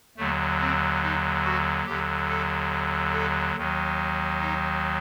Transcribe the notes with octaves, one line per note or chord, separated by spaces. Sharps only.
D#2 D3 F#3 A3
C4
D#4
F#4
D#2 D3 F#3 G4
A4
A4
D#2 D#3 F#3
D#4